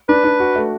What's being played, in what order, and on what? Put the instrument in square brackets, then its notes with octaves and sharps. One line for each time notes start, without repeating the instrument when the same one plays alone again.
[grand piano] D4 [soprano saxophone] B4
[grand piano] D4
F#4
A3